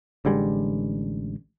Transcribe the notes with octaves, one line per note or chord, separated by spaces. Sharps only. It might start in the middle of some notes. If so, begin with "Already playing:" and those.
A1 D3 G3 G#3